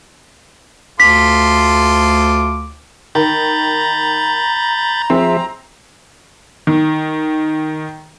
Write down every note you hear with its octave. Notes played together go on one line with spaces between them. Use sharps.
D2 F4 A4 C6 D6 B6
D#3 A#5 B5 G6 A6
F3 C4 G#4 E5
D#3